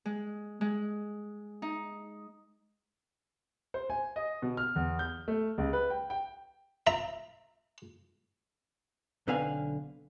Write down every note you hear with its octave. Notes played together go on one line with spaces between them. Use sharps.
G#3
G#3
D#4
C5
G#5
D#5
B2
F6
E2
G6
A3
C#2
B4
G5
G5
E5 A#5
B1 D3 C4 B4 F5 G#5